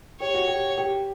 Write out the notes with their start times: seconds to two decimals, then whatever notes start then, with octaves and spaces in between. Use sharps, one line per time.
0.20 G4 C#5
0.34 F#4
0.48 G4
0.78 G4